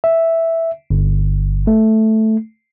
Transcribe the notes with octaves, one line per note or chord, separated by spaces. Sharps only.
E5
G1
A3